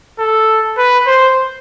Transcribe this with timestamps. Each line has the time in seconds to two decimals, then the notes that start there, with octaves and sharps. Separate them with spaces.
0.19 A4
0.78 B4
1.07 C5